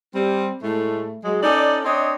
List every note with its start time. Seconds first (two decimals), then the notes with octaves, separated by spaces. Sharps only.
0.15 G3 C4
0.62 A2 G#3 A3
1.25 F#3 G#3
1.43 C#4 D#4 A4 D5
1.85 C4 D4 C#5 D#5